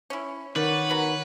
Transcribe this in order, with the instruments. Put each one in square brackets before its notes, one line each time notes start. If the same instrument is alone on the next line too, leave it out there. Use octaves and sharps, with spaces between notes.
[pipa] C#4 E4
[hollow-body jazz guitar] D#3 [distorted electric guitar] B4 [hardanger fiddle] C#5 F#5 [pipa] D5
[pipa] B3 F#4 A#5